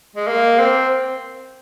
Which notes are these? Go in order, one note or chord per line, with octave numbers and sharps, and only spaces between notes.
G#3
A#3
C4